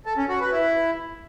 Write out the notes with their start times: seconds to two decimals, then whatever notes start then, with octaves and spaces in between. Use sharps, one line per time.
0.06 A4
0.17 C#4
0.29 F#4
0.40 B4
0.52 E4